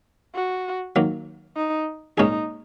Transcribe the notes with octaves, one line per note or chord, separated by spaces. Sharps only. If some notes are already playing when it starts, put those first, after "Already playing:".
F#4
D#3 F#3 A#3
D#4
A#2 G#3 C#4 D#4 G#4